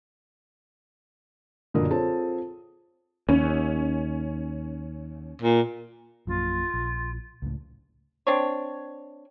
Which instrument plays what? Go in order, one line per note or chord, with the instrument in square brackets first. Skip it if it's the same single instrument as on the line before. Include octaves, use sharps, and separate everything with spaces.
[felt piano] F#1 A#2 D3 F#3 A#4 D#6
C4 F4 G#4 A4 C#5 A5
[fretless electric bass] D#2 [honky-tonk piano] C#4
[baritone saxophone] A#2
[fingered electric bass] A#1 F#2 A#2 [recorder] F4
[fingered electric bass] A#1
C#2 A2
[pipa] C4 D4 C#5